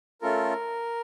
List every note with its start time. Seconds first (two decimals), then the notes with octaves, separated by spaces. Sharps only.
0.22 A3 C#4 F4 A4 A#4